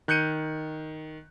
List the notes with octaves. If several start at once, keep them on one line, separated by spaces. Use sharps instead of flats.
D#3 F#6 G6 C#7 D#7